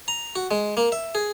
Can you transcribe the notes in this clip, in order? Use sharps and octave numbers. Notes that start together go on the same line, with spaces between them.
A#5
F#4
G#3
A#3
E5
G#4